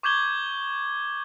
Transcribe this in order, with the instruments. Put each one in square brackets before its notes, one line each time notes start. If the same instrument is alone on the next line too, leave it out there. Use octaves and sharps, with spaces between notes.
[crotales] C#6 D6 G6 G#6 F#7 G7